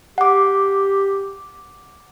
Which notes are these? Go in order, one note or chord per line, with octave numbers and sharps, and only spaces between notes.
G4 F#5 D6